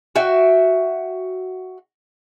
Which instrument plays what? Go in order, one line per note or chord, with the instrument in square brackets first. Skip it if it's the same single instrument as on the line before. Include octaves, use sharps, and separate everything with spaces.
[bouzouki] F#4 E5 G5